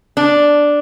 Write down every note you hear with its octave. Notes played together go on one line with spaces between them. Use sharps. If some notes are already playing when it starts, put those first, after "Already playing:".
D4